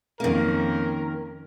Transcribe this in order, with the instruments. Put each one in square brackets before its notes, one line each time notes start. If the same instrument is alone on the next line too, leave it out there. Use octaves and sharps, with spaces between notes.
[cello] F2 C#4 [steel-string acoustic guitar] D#3 A#3 [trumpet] A#4